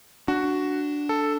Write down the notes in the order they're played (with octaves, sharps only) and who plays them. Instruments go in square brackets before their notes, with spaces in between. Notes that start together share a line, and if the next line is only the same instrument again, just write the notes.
[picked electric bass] D4 [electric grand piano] F#4
[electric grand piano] A4